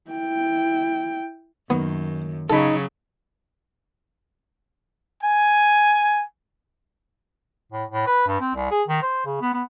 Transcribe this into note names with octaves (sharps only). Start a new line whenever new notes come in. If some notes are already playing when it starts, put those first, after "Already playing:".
E4 G5
F#2 D#3 F#3 A#3 B3
C#3 F#3 D#4 A4 F5 B5
G#5
A2
A2
B4
G2
C4
C2
G#4
D#3
C5
C#3
B3
B3